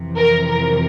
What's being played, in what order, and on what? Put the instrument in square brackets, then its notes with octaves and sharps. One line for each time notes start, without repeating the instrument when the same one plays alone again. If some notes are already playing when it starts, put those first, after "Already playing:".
Already playing: [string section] F2 C3 E3
A#4
A#4